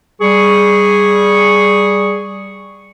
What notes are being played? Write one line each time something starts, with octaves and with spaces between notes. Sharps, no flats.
G3 G#4 C#6